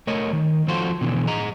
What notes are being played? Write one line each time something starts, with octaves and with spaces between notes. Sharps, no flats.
A3 A#4 C#5 D#5
D#3
F3 F4 F#4 A4 C5
B2 D3 E3 B3
G#4 D#5 A#5